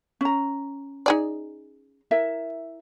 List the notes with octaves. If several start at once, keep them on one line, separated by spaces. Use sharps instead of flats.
C#4 A#5
D#4 G#4 D5
E4 A#4 E5